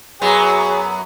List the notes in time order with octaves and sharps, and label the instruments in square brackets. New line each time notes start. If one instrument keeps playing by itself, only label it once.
[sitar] F#2 F#3 B3 [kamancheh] G#4